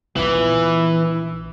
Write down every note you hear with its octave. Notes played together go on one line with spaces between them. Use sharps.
A#1 E3 B3